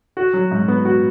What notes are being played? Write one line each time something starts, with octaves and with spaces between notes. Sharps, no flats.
F#4
F#3
G#2
B3
F#4